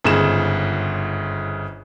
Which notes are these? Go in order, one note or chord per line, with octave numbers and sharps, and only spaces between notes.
G1 G#2 C#3 G#4 E7